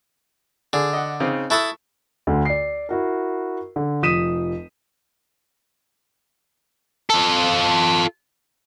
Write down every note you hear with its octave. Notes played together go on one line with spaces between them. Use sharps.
D3 G#4
D#5 F#5
C#3 C4 D#4
E4 A4 A5 C#6 D#6 F#6
D2 D3
D5 C7
E4 F#4 A#4
D3
F1 F3 D#6 B6 D#7 E7
F4 A4